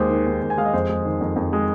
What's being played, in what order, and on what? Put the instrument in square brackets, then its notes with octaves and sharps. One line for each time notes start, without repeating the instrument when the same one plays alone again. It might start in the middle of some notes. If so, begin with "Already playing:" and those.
Already playing: [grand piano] D#2 G#3 C5
D#3
D#2
D#2
G#5
G#3 F5
D#5
F2 C5
G#3
D#3
F2
F2
G#3